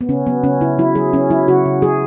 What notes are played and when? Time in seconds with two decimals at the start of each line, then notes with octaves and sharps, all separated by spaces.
0.01 B3
0.09 C#3 C#4
0.27 F#3 B3
0.44 C#3 C#4
0.61 C#3 E4
0.78 F#3 E4
0.95 F#3 G#4
1.13 F#3 C#4
1.30 F#3 E4
1.48 C#3 F#4
1.65 C#3
1.82 F#3 G#4